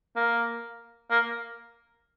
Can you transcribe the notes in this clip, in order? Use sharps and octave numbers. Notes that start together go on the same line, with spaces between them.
A#3
A#3